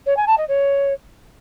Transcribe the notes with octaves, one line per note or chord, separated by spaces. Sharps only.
C#5
G#5
A5
D#5
C#5